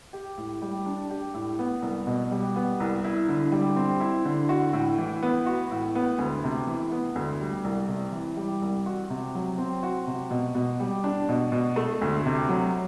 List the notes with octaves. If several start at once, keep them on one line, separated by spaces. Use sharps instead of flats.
G4
A2
G3
D4
G4
A2
B3
C2
B2
G3
B3
C2
E4
D3
G3
C4
E4
D3
F#4
A2
E3
B3
F#4
A2
B3
D2
C3
E3
B3
D2
G3
C2
C3
E3
G3
C2
F#4
C3
F#3
C4
F#4
C3
B2
B2
G3
D4
B2
B2
A3
D2
C3
F#3